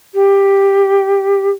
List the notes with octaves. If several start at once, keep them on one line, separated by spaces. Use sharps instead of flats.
G4